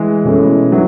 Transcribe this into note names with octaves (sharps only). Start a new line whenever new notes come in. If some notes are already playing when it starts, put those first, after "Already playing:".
Already playing: E3 G#3
B2 A3 C#4 E4
E3 F#3 B3 E4